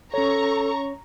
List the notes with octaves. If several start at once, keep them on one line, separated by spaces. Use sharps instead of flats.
C#4 A4 C#5 A#5 C#6